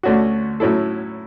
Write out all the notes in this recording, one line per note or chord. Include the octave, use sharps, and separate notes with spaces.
D2 D3 A3 C#4 F#4
A2 F#3 C#4 E4 A4